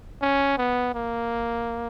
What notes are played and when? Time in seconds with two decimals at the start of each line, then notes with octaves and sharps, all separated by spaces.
0.22 C#4
0.58 B3
0.95 A#3